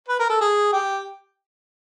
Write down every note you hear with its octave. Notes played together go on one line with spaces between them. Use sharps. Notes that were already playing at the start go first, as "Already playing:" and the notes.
B4
A#4
A4
G#4
G4